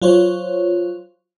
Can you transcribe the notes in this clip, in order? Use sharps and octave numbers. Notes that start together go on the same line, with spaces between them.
F#3 F4 C5 C#5